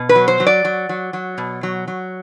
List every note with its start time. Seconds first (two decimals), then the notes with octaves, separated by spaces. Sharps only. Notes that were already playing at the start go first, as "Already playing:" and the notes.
Already playing: B2
0.09 B4
0.15 F#3
0.28 C5
0.40 F#3
0.47 D5
0.65 F#3
0.89 F#3
1.13 F#3
1.38 B2
1.63 F#3
1.88 F#3